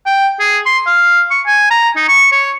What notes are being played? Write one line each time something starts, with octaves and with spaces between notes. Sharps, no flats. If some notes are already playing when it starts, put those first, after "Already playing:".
G5
G#4
C6
F5
C#6
G#5
A#5
D#4
C#6
C#5